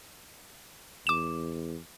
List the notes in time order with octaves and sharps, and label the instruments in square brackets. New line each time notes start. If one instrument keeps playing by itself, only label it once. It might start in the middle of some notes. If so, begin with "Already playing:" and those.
[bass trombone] E2 [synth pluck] D6 E7